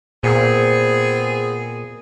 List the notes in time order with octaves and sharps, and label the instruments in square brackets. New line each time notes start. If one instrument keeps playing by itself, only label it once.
[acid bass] A#2 [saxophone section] B3 C4 G#4